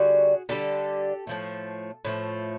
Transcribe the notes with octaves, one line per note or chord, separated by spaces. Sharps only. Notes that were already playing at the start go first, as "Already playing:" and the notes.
Already playing: D3 G3 F#4 G#4
D3 G3 G4 A4
A2 F3 A3
A2 F3 A3